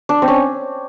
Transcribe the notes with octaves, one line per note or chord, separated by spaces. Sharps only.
D4
C4
C#4